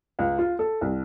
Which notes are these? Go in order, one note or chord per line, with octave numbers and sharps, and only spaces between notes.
C#2
F4
A4
C2